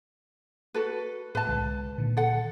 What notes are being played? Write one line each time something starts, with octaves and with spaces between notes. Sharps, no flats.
F#4 A4 B4
A2 B4 A5
C2 D3 G#3
A#2 D3 D#3
A4 F#5